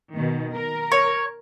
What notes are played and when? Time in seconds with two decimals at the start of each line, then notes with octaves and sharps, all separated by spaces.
0.15 B2 D#3
0.55 A#4
0.92 C#5